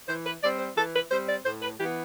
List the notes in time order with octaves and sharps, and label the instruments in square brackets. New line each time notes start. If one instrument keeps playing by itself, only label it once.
[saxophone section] E3 C5
B4
G3 C4 D5
C5
E3 A4
B4
G3 C4 C5
D5
A2 C5
B4
E3 G4
B3